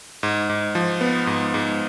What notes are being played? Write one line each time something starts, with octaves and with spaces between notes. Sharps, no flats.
G#2
G#2
F3
B3
G#2
G#2